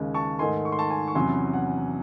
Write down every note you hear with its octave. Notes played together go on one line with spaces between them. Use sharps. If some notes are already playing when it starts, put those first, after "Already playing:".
Already playing: D#2 C#3 G#3
A5 C#6
G#2 D#3 A3 D#4 G#5 C6
C#6
C6
A5 C#6
G#5 C6
C#6
E2 C3 F#3 C#4 E4 G#5 C6
F#5